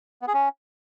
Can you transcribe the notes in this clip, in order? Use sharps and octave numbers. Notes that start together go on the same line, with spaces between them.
B3
G#4
C#4